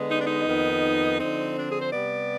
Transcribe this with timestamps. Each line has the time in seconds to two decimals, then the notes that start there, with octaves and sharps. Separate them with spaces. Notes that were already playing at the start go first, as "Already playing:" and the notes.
Already playing: D3 G#3 B3
0.09 D#4
0.17 D4
0.25 D#4
0.45 F2 D#3 B3
1.19 D3 F3 C4 D#4
1.56 D4
1.68 G#4
1.80 C5
1.91 C3 G3 B3 D5